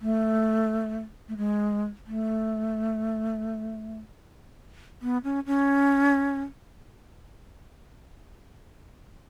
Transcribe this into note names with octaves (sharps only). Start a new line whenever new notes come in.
A3
A3
G#3
A3
B3
C#4
C#4